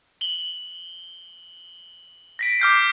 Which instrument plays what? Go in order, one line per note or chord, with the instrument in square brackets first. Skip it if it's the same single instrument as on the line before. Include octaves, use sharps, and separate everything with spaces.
[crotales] F#7 G7
A#6 B6 D7
D6 F6 G6 C7